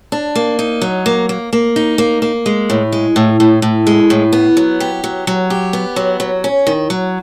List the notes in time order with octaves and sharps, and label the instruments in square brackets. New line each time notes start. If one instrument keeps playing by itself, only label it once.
[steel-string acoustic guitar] D4
A#3
D#4
F#3
A#3
A#3
A#3
D#4
A#3
A#3
G#3
A2
G#3
A2
A2
A2
G#3
A2
B3
F#3
G4
F#3
F#3
G4
B3
F#3
F#3
C#4
D#3
F#3